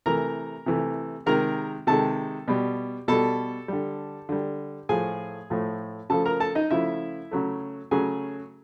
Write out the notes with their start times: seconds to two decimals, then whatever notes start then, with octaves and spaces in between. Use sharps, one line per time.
0.06 C3 E3 A3 A#4 A#5
0.66 C3 E3 A3
1.26 C3 D#3 G#3 A#4 A#5
1.87 C3 D#3 G#3 A4 A5
2.48 B2 G3
3.08 B2 G3 A4 A5
3.68 D3 G3
4.29 D3 G3
4.89 A2 F3 A3 G#4 G#5
5.50 A2 F3 A3
6.10 C#3 F3 A3 A4 A5
6.25 A#4 A#5
6.40 A4 A5
6.55 D#4 D#5
6.71 C#3 F3 A3 E4 E5
7.31 C#3 F#3 A3
7.91 C#3 F#3 A3 G#4 G#5